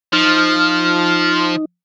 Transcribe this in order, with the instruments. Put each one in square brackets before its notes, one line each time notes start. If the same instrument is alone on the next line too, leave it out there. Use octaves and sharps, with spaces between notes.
[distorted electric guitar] F3 [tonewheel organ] D#4 [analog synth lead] F6